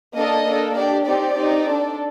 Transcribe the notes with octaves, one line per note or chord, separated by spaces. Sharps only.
A#3 D4 A4 D#5
A#3 D4 A4
D4 G4 D5
C4 D#4 G4 D5
C4 D#4 G4
D4 A4